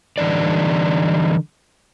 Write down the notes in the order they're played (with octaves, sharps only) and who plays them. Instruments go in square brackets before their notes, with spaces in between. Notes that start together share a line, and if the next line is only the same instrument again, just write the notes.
[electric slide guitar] D3 E3 G3 D#4 D5